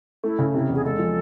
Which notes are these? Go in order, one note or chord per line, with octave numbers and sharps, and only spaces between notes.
A3 E4
C#3
C3 E4
E2
G#4
G#3 A4
F3